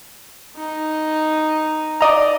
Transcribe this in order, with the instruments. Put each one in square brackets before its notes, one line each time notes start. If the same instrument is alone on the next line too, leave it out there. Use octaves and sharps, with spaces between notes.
[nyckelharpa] D#4
[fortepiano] D5 D#5 A#5